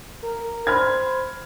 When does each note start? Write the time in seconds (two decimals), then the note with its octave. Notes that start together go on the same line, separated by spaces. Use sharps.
0.23 A#4
0.67 C5 B5 F6 G#6